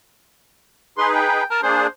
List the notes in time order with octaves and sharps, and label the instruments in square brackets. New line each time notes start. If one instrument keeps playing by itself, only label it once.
[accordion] D#4 G#4 B4 [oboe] C6
[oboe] G5
[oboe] A#4 [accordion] A5
[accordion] A#3 D4 G#4 [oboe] C5